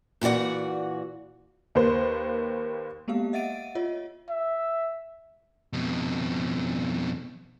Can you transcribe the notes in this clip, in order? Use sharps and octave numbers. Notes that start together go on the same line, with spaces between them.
A#2 E3 F#4 D5 F#5
D#2 A#3 B4 C5
G#3 A#3 B3 G4 F5
D#5 E5 F#5 A6 D7 D#7
F4 C#5 D#5
E5
F2 B2